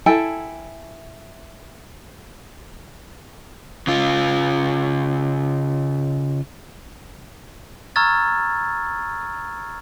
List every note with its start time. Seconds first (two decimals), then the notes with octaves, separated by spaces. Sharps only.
0.06 E4 A4 G5 G#5
3.87 C#3 F4
7.96 A#5 C#6 E6 F6 G#6 A6